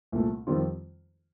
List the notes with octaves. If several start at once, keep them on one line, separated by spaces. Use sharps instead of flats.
C2 A#2 A3
F2 D#3 G3 C4 F4